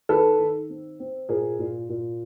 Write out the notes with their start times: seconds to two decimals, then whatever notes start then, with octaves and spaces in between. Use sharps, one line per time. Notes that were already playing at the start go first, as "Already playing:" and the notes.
0.09 D#3 A4 B4
0.39 D#3
0.70 C4
1.00 C4
1.29 A#2 G#4 A#4
1.59 A#2
1.89 A#2